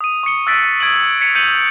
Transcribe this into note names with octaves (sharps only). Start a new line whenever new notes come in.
D#6 D#7
C#6 D#6 C#7 G7
E6 F#6 A6 B6 D7
D#6 G#6 D7 D#7 F#7
G#6 B6 C#7 D#7 F7
F#6 G6 C#7 D#7 F7 F#7